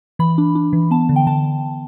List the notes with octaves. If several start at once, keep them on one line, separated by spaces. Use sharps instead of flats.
E3 B5
D4
D4
E3
B3 A5
D3
G5
D3 A5